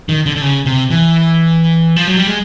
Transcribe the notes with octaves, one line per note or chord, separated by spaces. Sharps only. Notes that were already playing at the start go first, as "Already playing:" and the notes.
D#3
D3
D3
C#3
C3
E3
F3
F#3
G3
G#3